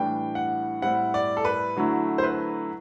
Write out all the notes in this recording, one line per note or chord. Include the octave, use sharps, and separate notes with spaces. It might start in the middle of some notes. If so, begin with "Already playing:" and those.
Already playing: A2 E3 G3 D4 G5
F#5
A2 G3 C4 E4 F#5
D5
A4
B4
D3 F#3 A3 E4
C5
B4